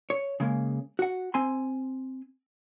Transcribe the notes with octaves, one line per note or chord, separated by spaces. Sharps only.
C#5
C#3 G#3 A#3
F#4 F#5
C4 G#5 C6